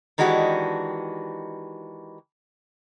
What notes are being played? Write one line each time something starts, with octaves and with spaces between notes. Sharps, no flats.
D#3 E3 G#3 D4 F#4 G4